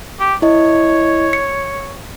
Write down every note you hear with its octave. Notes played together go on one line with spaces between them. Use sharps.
G4
E4 C#5 D#5
C#7